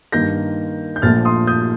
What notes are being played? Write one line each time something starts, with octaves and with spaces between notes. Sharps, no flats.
G2 D#3 A#3 G6 A#6
G6
A#1 A#2 F3 A3 F6 A6
C6 D#6
D#6 G6